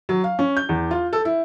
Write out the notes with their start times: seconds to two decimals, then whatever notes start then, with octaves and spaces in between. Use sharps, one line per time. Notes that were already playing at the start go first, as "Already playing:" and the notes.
0.09 F#3
0.24 F5
0.39 C#4
0.57 G6
0.69 E2
0.91 F4
1.13 A4
1.25 E4